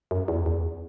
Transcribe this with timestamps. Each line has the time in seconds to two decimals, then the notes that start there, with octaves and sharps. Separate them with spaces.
0.11 F#2
0.28 E2
0.46 E2